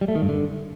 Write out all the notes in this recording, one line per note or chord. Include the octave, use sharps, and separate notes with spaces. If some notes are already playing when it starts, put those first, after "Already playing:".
G3
A3
D#3
G2
D3